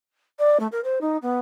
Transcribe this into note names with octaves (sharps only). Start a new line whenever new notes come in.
D5
A3
A#4
C5
D#4
B3